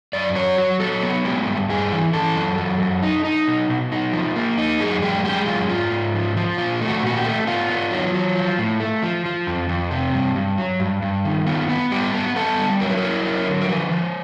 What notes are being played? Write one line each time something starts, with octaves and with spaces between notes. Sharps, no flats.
F#2 D5
F#3 C#5
F#3
F#3 A4
B3
G#3 G4
G2
G2 G#4
E3
E3 A4
F#2
F#2
F#2
D#4
D#4
B2
B2
D#4
F3
A#3
D#4
F#2 G#4
G#3 G4
G#3 G4
F#2 F4
G#2 F4
G#2
F3
F3
A#2 F4
A3
F#4
A#2 F#4
G4
A3
B3 F4
B3
F#3
F#3
F3
A2
A3
F3
F3
F2
F2
C3
G2
G2
F#3
G2
G2
D#3
B3 F4
B3
G3 G4
B3
B3 A4
G3
F#3 A#4
B4
E4 A#4
F#3
D3
A#4
F3 B4
F3